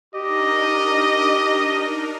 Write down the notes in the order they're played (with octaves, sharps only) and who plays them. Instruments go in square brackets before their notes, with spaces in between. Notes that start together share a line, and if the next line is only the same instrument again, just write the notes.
[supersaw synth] D4 D#4 A#4 [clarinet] G4 [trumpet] D#5